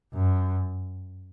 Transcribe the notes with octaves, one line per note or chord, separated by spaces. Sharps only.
F#2